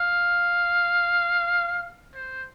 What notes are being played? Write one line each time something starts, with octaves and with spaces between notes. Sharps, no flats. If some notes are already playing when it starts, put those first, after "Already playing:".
Already playing: F5
C5